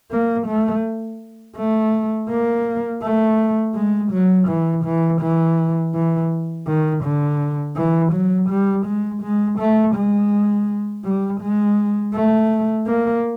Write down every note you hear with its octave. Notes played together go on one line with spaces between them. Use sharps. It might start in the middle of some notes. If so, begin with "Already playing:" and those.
A#3
A3
A3
A#3
A3
G#3
F#3
E3
E3
E3
E3
D#3
D3
E3
F#3
G3
G#3
G#3
A3
G#3
G3
G#3
A3
A#3